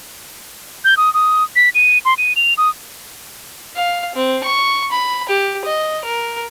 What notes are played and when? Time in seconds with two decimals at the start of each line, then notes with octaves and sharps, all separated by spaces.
0.84 G6
0.97 D#6
1.14 D#6
1.56 B6
1.75 D#7
2.05 C6
2.18 D#7
2.36 F7
2.58 D#6
3.75 F5
4.15 C4
4.43 C#6
4.92 B5
5.29 G4
5.65 D#5
6.05 A#4